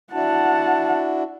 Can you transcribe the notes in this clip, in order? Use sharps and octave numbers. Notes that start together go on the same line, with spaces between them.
D4 E4 F#4 F#5 A5